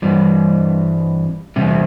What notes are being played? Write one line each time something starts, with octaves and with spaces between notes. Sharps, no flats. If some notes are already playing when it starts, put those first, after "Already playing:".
G2 E3 G3 C4
E2 C3 G3 C4